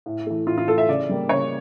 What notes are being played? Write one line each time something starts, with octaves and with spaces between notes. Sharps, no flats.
A2
E3 A3
A2 F4
F4
E3 A3 A4
E5
C#3 D5
G3 A#3
C#3 C#5